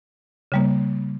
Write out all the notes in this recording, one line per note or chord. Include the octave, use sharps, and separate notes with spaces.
C#3 G3 A#3